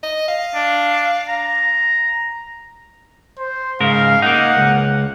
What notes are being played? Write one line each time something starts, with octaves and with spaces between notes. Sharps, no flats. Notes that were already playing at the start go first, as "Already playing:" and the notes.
D#5
F5
D4
A#5
C5
G#2 C#3 A#4 F5
A#3 D#4 F#5
C#2